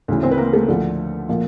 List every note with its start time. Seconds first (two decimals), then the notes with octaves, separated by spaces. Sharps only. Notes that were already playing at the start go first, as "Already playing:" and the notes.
0.08 D2 C#3 E3
0.23 C4 C5
0.31 B4
0.38 A#3 A#4
0.53 A3 A4
0.68 D2 D3 F3
1.29 A#2 F3